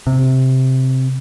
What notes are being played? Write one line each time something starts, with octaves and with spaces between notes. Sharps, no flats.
C3